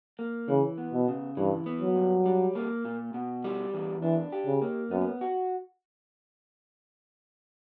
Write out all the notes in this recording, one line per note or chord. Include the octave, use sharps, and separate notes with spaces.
A#3
C#3 E3
B3
B2
C#3
G2 E3
B3
F#3
G2
G3
A#3
A#2
B2
G3
E2
E3 D4
G4
C#3
A#3
F#2 B3
F#4